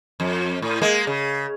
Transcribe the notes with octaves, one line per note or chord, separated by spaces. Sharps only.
F2
A2
G#3 A#3
C#3